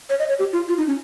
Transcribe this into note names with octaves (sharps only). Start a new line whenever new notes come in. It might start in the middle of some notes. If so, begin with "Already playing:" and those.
C#5
D#5
C#5
G4
F4
F4
D#4
C#4